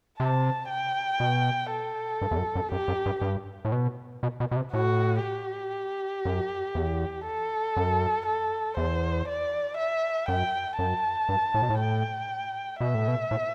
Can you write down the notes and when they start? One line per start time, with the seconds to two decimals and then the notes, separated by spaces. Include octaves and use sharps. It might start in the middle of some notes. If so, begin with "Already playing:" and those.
0.20 C3 A5
0.69 G5
1.20 B2
1.71 A4
2.21 G2
2.31 E2
2.38 F#2
2.55 F#2
2.72 F#2 G4
2.88 F#2
3.06 G2
3.21 G2
3.65 A2
3.72 B2
4.23 B2
4.40 B2
4.51 B2
4.56 C3
4.73 A2 F#4
5.23 G4
6.25 F#2
6.75 E2
7.25 A4
7.76 F#2
8.26 A4
8.77 E2 C5
9.28 D5
9.77 E5
10.28 F#2 G5
10.78 F#2 A5
11.29 G2
11.54 A2
11.62 B2
11.70 A2
11.80 G5
12.80 B2 E5
12.94 A2
13.08 B2
13.31 A2